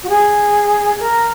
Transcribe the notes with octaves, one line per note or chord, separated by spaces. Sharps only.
F#4
G#4
A#4